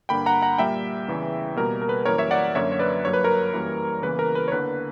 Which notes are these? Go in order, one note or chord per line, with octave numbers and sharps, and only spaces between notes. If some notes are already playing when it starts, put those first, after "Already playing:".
G2 D3 A#3 G5 B5
F#5 A#5
F#5 A#5
A#2 G3 A#3 E5 G5
E2 C#3 E3
B2 G3 A#3 A#4
A#4
B4
F#2 E3 G3 A#3 A#4 C#5
C#5 E5
D5 F#5
F#2 D3 F#3 A#3 C#5 E5
C#5
B4 D5
G2 F#3 A#3 C#5
B4
A#4 C#5
F#2 E3 G3 A#3
E2 C#3 E3 A#3 B4
A#4
B4
C#5
E2 D3 A#3 B4